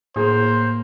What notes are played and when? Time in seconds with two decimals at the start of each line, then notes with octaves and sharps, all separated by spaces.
0.16 A2 A#3 G#4 C5